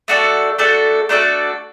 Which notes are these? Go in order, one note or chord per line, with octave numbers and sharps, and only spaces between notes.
A3 D4 F#4 A4
A3 D4 F#4 A4
A3 D4 F#4 A4